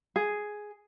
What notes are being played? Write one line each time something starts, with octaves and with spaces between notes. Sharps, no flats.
G#4